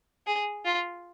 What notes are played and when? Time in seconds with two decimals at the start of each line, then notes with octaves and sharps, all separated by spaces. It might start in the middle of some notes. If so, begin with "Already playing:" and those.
0.27 G#4
0.65 F4